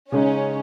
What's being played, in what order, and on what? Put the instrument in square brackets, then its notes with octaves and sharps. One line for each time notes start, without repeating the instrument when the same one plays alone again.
[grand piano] C#3 G#3 D#4 [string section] C#4